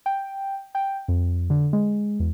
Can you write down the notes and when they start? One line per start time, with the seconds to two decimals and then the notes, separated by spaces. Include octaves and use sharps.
0.06 G5
0.75 G5
1.08 F2
1.50 D3
1.73 G#3
2.20 E2